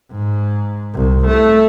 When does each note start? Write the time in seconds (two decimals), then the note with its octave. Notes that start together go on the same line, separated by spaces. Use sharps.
0.11 G#2
0.94 C2
1.27 A3